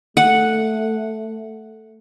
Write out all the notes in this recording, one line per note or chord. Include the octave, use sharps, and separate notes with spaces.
A3 F#5